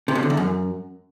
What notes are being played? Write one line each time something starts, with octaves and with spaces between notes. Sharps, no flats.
C3
B2
D3
E2
F#2